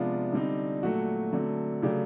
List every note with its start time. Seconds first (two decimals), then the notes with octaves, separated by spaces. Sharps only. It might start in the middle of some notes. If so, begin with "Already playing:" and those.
Already playing: C3 F3 G#3 B3 D4 F4
0.33 D3 G3 C4 D#4
0.83 A#2 F#3 A3 F#4
1.33 D3 F#3 A3 C4
1.82 C#3 F#3 A3 D4 G4